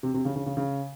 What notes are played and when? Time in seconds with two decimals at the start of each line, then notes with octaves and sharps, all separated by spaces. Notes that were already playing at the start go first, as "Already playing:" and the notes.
0.03 C3
0.14 C3
0.25 C#3
0.36 C#3
0.46 C#3
0.57 C#3